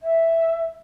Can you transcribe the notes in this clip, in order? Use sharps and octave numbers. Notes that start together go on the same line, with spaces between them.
E5